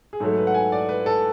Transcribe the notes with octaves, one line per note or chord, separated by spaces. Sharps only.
G#4
G#2 F#3 A3 A4
B4
F#5
G#5
D5
B4
A4